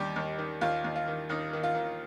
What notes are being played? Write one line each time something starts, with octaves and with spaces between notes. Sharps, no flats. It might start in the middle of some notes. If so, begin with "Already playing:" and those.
Already playing: D#2 G3 G4
D#2
D#3
D#2 F4
D#2
F4
D#3
D#2 D#4
D#3
F4
D#3